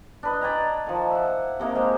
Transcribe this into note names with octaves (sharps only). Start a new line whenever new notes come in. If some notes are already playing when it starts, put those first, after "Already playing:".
D4 B4 D#5
D5 G5 G#5 A#5
D#3 F3
E5 F#5
C3 A#3 D#4
G#3 G4 A#4 C5